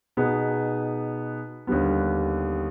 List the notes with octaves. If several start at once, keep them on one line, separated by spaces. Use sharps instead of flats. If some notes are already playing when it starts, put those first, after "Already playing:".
B2 B3 D#4 G#4
D#2 D3 G3 B3